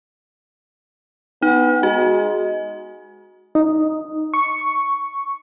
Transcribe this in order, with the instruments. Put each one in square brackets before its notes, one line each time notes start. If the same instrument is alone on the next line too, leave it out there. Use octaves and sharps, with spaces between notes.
[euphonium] B3 [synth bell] D#4
[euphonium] G#3 [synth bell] F#4
[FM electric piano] D#4
C#6